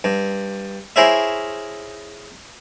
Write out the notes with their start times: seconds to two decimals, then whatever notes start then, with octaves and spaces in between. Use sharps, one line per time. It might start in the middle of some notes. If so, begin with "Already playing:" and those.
0.04 G2
0.96 E4 G#4 A#4 C5 C#5 E5